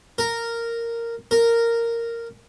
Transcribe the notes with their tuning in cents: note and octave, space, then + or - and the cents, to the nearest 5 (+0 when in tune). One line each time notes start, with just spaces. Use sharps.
A#4 -10
A#4 -10